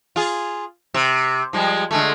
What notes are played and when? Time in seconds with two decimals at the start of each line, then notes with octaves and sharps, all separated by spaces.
0.16 F4 G#4
0.94 C3
1.53 F3 G3 G#3
1.91 D3 G#3 A3